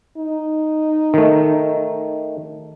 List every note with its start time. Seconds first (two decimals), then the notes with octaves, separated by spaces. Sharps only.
0.17 D#4
1.14 D#3 A3